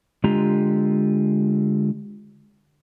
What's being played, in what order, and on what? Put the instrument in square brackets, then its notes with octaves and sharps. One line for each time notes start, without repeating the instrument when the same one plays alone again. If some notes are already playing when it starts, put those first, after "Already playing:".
[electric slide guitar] D3 G#3 F4 G4 A#5